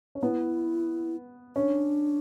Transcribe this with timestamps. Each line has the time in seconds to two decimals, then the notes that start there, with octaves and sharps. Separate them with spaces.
0.15 C#4
0.22 B3 E4
1.56 C#4 D4